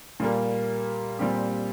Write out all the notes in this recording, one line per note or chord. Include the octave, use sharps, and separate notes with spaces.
A#2 G3 A#3
A#2 G3 C4 G4